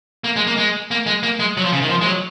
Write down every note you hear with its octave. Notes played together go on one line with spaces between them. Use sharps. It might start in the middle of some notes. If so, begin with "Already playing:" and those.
A#3
G#3
A#3
G#3
A#3
G#3
A#3
G#3
F#3
F3
C#3
D#3
F3
G#3
F#3